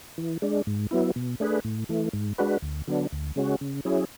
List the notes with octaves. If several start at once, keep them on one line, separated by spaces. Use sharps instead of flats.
E3
G#3 D4
G#2
F#3 B3 E4
B2
A3 D4 G#4 B4
A2
E3 A3
G#2
G#3 D4 F#4 B4
D2
D3 F#3 B3 D4
D2
C#3 G#3 C#4 F#4
C#3
F#3 C#4 E4 G#4